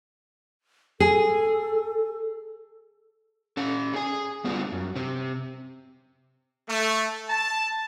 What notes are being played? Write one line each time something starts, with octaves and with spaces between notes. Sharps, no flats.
G#4 A4
C#4 A4
G#4 G#5
G3 B3 C4 F4
F#2
C3 C4
A3
A5